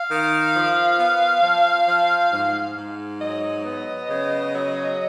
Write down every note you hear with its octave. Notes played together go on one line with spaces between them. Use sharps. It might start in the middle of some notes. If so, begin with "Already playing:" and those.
Already playing: F5
D#3
F3
B3
F3
F3
G#2
G#2
F#3 D#5
B3
C#3
F#3